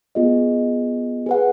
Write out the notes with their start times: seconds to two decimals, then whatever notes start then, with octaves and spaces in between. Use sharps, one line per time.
0.15 B3 F4 G#4 D#5
1.26 G#4 B4 F#5